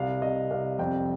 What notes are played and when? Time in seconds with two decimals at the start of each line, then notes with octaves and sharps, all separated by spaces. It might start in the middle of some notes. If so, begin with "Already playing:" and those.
Already playing: C2 F5
0.22 C2 D#5
0.50 C2 F5
0.79 F2 G5